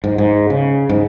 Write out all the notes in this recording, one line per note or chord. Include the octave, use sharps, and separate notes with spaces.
G#2
G#2
C#3
G#2